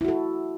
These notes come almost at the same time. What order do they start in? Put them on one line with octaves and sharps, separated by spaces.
E4 F#4 A4